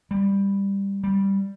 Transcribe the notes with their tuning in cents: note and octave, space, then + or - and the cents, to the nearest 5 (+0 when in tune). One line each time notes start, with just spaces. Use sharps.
G3 +15
G3 +0